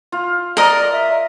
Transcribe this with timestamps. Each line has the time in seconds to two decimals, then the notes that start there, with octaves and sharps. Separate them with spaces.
0.12 F4
0.57 A#4 D5 D#5 A#5
0.92 E5